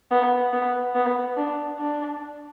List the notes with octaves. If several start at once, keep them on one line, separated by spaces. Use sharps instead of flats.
B3
B3
B3
D4
D4